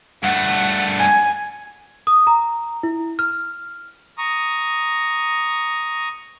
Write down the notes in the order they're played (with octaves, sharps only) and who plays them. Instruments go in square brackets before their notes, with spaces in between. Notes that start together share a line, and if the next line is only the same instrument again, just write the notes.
[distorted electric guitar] G2 A3 [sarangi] F#5
[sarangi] G#5
[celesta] D#6
A#5
E4
F6
[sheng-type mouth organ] A#5 C#6 D#6